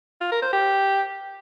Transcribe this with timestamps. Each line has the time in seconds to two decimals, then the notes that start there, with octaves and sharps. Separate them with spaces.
0.21 F4
0.32 A#4
0.42 C5
0.53 G4